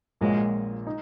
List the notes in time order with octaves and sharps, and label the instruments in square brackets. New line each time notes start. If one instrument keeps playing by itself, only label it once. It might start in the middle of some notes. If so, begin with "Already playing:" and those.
[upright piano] A#1 A#2 A#3 F#4 C#5 [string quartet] G#3
[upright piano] D#4